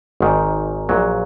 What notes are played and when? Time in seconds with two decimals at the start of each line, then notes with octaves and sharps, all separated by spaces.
0.21 G#1 G#2 D#3
0.89 A#1 A#2 F#3